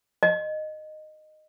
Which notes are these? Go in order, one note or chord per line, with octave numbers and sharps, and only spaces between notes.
D#5